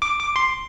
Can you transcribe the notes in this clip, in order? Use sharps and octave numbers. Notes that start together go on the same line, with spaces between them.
D6
D6
C6